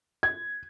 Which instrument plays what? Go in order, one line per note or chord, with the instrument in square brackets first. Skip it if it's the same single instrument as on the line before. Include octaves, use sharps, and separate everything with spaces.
[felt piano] G#6